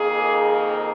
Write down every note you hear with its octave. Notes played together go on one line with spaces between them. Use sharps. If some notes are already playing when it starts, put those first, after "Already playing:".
Already playing: F2 D#3 A#3 G#4
G#4